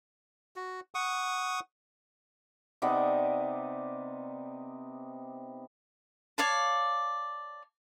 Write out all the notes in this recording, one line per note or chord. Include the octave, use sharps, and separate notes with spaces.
F#4
F#5 C#6 D#6
C3 B3 D#4 D5
C#5 D5 F5 A5